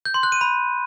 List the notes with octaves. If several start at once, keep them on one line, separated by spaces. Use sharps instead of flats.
G6
C6
F#6
D#7
B5